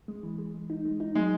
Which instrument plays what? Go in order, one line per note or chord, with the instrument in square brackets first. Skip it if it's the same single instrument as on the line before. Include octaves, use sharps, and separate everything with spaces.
[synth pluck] G#3
E3
G#3
G#3
D#4
G#3
D#4
[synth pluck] F#3 [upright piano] G#3